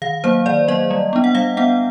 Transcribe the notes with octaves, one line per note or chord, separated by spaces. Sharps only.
D#3 F5
F#3 A#3 C5
D#3 D5
F#3 A#3 D#5
G3
B3 D4
F#5
G3 F5
B3 D4 F#5